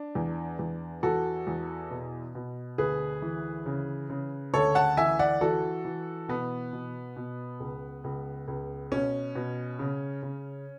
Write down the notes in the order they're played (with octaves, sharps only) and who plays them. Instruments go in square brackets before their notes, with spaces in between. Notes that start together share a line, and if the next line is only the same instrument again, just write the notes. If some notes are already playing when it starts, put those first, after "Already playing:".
Already playing: [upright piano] D4
E2
E2
E2 F#4 A4
E2
B2
B2
D2 G#4 B4
E3
C#3
C#3
D2 A4 C#5
F#5 A5
E3 E5 G#5
D5 F#5
E3 F#4 A4
E3
B2 B3
B2
B2
C#2
C#2
C#2
B2 C#4
B2
C#3
C#3